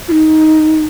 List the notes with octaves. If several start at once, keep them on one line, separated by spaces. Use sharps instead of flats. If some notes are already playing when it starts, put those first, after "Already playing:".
F4
D#4